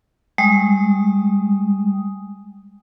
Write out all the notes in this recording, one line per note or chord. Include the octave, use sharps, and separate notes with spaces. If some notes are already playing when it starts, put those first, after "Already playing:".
G3 G#3 D#6